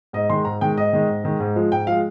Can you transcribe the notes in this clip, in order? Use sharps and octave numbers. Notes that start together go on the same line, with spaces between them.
G#2 D#5
D#3 G#3 C6
G#2 A#5
D#3 G#3 G5
G#2 D#5
D#3 G#3
G#2
D#3 G#3
G#2
F3 G#3
G#2 G5
F3 G#3 F5